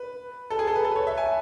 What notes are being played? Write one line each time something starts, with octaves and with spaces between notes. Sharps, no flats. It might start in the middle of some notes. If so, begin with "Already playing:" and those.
Already playing: B4
A4
G#4
A4
B4
A4
B4
C#5
E5
G#5